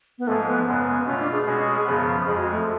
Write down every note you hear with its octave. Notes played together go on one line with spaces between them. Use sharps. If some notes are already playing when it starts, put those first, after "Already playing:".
B3
G#2 F3 G#3 A3
B3
F#2 C#3 G#3 B3
B3
B2 A3 C#4 F4
D4
G#4
B2 G#3 C#4 F#4
F#2 C#3 F3 B3
F2 F3 G#3 G#4
F#4
A3